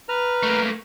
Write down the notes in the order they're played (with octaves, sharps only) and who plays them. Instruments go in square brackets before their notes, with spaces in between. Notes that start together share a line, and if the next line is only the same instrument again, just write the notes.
[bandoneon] B4 A#5 F6
[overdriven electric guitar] A3 A#3